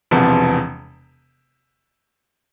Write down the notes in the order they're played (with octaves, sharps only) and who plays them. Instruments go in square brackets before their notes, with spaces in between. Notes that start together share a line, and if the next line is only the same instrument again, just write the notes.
[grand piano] E1 E2 C3 F3 B3